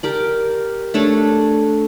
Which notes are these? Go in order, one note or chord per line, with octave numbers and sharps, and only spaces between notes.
G4 A#4 D5
A3 D4 A4 C#5